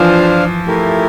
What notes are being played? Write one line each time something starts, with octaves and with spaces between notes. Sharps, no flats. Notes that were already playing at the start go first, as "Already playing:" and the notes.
Already playing: E3 F3 D4 F4 C5 F5
A3 E4 G4 A#4